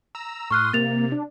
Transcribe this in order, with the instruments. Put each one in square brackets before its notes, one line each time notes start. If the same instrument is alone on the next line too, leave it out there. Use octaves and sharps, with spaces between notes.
[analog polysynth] A#5 E6
[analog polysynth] A2 C6 D#6 [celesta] C#6 F6 F#6
[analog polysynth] C3 [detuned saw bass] A#3 [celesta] A6 F7
[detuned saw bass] D4